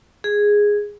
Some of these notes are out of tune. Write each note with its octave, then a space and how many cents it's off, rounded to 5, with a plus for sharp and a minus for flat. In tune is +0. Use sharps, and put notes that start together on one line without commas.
G#4 -5